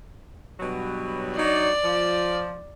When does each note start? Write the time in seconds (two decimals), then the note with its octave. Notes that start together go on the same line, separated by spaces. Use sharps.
0.60 G2 B2 F#3
1.38 F#3 D4 D#4 D5
1.84 F3